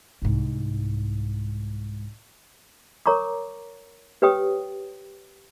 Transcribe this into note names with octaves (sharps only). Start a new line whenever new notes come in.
C2 G#2
A#4 C#5 A#5 C#6 D6
G4 B4 C#5 G5 D#6